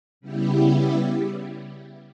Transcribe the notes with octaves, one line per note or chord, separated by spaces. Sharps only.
C#3 G3 B3 E4 G4